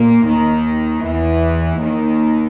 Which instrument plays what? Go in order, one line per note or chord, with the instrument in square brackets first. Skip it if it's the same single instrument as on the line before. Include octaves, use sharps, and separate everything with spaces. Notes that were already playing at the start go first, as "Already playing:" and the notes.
Already playing: [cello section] A#2 A#3
D#2 D#3
E2 E3
D#2 D#3